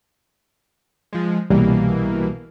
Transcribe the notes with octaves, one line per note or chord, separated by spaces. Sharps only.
F3 G#3
C2 B2 E3 G3 A#3